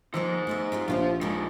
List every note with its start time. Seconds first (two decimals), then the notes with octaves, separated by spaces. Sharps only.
0.14 D#3 F3 A#3 D#4 C5 E6
0.47 A3 B3 D#5 E5
0.72 C4 F4 G4
0.88 A#1 A#3 B3 F4 G4 C5 C#5
1.21 F3 G3 G#3 D#4